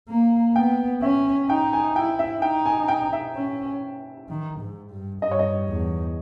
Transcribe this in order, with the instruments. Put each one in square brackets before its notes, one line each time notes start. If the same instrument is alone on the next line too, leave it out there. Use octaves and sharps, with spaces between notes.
[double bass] A#3
[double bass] B3 [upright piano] G5
[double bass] C#4 [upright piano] E5
[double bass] D#4 [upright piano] G5
[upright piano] G#5
[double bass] E4 [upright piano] G5
[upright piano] E5
[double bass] D#4 [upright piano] G5
[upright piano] G#5
G5
E5
[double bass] C#4
D#3
G#2
G2
[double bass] G2 [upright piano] D#5
[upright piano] C#5
D#5
[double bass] E2